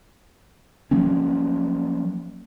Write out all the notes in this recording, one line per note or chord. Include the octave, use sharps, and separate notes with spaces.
F3 F#3 A#3 C#4